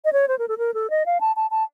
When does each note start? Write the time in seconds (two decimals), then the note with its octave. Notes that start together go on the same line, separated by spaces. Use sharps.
0.05 D#5
0.13 C#5
0.28 C5
0.39 A#4
0.48 A4
0.58 A#4
0.74 A4
0.90 D#5
1.06 F5
1.21 A5
1.36 A5
1.51 A5